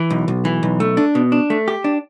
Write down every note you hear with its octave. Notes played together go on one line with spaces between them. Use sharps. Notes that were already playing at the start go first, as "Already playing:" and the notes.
Already playing: E3
B1
B1
E3
B1
A3
D4
B2
D4
A3
G4
D4